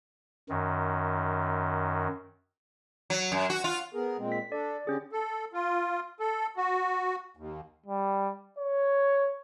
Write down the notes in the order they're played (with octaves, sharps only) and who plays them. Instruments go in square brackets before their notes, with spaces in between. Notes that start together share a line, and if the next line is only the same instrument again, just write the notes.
[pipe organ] F#2 D#3
[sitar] F#3
F#2
F#4
F4
[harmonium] B3 G#4 A#4
A#2 G#3 C4
[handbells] B6
[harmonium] D4 A4 [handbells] D5
[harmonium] D3 G4 [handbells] C#4 G#4
[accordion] A4
F4
A4
F#4
D#2
[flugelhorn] G3
C#5